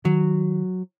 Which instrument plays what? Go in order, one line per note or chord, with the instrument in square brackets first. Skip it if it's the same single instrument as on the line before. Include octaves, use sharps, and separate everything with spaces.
[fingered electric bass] D#3 [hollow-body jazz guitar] F#3